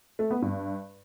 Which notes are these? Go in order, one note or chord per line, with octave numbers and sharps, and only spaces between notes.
A3
B3
G2